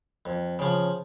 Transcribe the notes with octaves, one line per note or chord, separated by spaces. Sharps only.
F2
C#3 F3